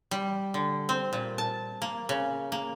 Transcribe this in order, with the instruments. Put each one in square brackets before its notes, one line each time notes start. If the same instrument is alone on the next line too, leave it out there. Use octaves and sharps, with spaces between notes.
[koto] G3
D3
C4
A#2
A5
A#3
C#3
A#3